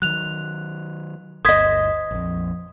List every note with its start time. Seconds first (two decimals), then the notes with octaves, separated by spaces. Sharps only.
0.02 D#3 F#3 F#6 F7
1.45 G1 D2 C5 D#5 D#6 G#6 B6
2.11 A#1 F2